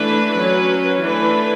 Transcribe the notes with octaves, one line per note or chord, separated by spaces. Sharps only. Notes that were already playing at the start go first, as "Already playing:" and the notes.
Already playing: E3 A3 D4 B4
F#3 C#4
E3 A3 D4 B4